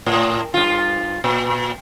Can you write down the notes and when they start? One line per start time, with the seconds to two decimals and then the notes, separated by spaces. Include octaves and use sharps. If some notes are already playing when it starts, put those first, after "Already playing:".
0.06 A2
0.54 G2 F4
1.24 A#2